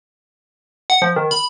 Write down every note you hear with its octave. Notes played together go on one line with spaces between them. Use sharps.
F#5
F3
D#3
B5